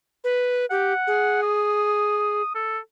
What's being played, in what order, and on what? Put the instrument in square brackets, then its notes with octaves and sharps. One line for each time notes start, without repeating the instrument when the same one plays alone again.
[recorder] B4
[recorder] G4 [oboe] F#5
[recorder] G#4
[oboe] D#6
A4